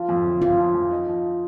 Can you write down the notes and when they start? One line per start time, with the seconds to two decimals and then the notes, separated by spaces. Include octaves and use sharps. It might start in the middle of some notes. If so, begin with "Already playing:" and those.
Already playing: F3 F4
0.09 F2
0.25 G1
0.41 G1 F4
0.57 F3
0.74 F2
0.91 D#4
1.07 F3